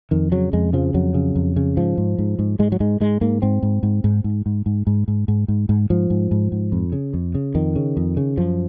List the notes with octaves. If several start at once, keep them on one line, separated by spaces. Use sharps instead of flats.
F2 D#3
C#3 F#3
F2 G#3
C#3 F3
F2 F#3
C#3
F2
C#3
G#2 F3
G#2
G#2
G#2
G#2 G#3
F#3
G#2 G#3
G#2 G#3
G#2 A#3
G#2 C4
G#2
G#2
G#2
G#2
G#2
G#2
G#2
G#2
G#2
G#2
G#2
G#2 F3
G#2
G#2
G#2
F2
C#3
F2
C#3
F2 D#3
C#3
F2
C#3
F#2 F3